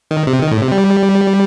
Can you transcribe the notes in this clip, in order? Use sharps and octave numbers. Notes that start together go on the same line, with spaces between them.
D#3
C3
D#3
A2
C3
G3